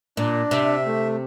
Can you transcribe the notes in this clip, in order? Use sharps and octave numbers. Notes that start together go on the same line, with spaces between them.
A#2 D4
C3 E5
A3